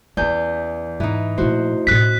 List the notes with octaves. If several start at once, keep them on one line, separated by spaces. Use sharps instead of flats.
E2 E3 C#4 D5 G#5 G6
G#2 E3 D#4
A#2 F3 A3 E4 F#4 C5
A2 C#4 F#6 B6